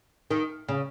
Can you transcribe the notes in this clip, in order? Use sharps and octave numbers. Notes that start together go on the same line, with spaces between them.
D#3
C#3